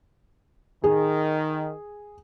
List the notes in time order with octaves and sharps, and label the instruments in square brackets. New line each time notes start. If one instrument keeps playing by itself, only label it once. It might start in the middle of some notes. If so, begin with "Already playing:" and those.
[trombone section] D#3 [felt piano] G#4